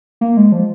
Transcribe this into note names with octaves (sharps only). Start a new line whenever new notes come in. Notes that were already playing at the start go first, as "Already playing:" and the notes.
A#3
G#3
F3